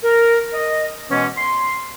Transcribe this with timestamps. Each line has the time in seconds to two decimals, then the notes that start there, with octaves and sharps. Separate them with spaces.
0.04 A#4
0.54 D#5
1.10 B2 E3 G#3 B3 C#4
1.37 C6